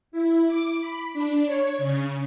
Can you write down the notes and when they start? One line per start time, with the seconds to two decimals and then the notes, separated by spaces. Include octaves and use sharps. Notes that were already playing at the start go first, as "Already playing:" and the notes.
0.12 E4
0.47 D6
0.80 B5
1.13 D4
1.45 C#5
1.78 C#3